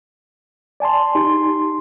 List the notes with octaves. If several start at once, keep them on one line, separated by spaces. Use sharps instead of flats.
D5 G#5 A5 C6
D#4 G4 C6